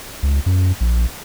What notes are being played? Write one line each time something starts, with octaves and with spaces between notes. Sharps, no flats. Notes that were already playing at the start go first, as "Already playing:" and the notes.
C#2
F#2
A#1